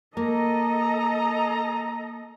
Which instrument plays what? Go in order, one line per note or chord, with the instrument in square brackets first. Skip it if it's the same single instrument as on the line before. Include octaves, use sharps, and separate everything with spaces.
[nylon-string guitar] A#3 [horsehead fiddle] A4 D#5 [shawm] A#5